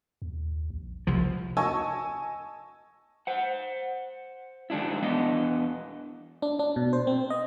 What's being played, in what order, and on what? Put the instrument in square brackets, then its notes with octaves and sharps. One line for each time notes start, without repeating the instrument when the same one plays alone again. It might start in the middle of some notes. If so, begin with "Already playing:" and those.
[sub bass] D#2
A#1
[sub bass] E1 [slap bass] C2 F3
[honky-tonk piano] D#5 G#5 A5 C#6 E6
[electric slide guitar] C5 F#5
D#3 G#3 D4 E4
E2 B3 D4 D#5
[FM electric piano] D4
D4
B2
C5
C4
D#5